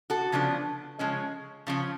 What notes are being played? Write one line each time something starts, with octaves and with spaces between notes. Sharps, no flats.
F#4 A4
C#3 F3 B3 D4
C#3 F3 G#3 C#4
C#3 F3 C#4